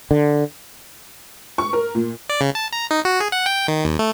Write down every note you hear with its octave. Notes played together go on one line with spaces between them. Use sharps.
D3
C#6
A#4
A#2
D5
C#3
A5
A#5
D#4
F#4
G#4
F#5
G5
D#3
D#2
A3